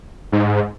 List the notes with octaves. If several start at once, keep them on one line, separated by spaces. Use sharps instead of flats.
G#2